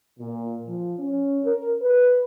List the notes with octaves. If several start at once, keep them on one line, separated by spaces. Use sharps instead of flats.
A#2
F3
C#4
A#4
B4